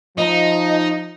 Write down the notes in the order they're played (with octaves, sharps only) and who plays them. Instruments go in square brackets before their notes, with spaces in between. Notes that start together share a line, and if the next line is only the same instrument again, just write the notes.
[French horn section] F3 [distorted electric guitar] D#4 [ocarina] D#5